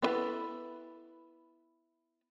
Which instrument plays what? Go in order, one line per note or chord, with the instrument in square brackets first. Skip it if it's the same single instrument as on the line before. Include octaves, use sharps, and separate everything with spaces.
[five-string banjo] B3 D4 E4 A4 B4